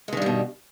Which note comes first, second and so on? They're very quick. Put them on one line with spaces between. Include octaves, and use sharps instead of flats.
G#3 D#3 G2 G3 B2